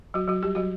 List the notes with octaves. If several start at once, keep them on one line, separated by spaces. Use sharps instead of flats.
F#3 F#4
F#3 F#4
G3 G4
F#3 F#4